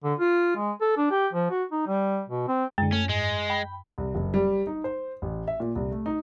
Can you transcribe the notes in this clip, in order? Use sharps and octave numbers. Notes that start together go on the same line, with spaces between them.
D3
F4
G#3
A4
D4
G4
F3
F#4
D#4
G3
B2
C4
F#2 D3 G#3
A3 C#4
G#2 G#3
G5 B5
C2
F#1
G3
D#4
C5
A1
E5
A#2
C2
A3
D#4